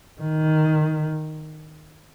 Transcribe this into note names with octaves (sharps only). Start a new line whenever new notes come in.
D#3